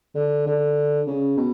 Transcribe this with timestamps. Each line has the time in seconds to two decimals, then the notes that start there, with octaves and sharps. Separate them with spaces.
0.15 D3
0.46 D3
1.07 C#3
1.37 B2